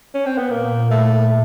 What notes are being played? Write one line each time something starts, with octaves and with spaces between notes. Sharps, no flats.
C#4
C4
B3
A#2 A#3
A3